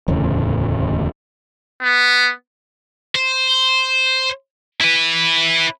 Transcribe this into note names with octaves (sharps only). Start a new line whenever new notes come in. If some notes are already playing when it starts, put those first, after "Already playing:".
D1 E2 A2 C#3
B3
C5
E4 B4